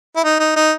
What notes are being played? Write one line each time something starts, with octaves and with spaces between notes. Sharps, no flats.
E4
D#4
D#4
D#4